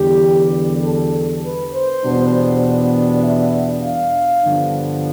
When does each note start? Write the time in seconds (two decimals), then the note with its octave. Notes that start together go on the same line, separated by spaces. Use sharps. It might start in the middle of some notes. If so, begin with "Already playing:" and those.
Already playing: E2 D3 G3 G4
0.83 A4
1.44 B4
1.74 C5
2.03 E2 B2 G3 B3 D4
3.24 E5
3.85 F5
4.44 G2 D3 F3 B3 D4